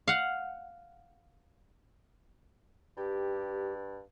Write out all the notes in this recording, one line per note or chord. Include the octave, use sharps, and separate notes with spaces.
F5 F#5
G2 G4